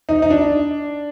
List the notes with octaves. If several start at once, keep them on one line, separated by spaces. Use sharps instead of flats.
D#4
D#4
D4